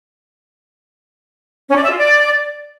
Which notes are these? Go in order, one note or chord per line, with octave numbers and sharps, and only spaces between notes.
C#4
D5
E5
F4
D5